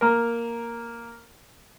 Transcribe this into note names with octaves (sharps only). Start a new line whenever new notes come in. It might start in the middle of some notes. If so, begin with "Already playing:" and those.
A#3 A#4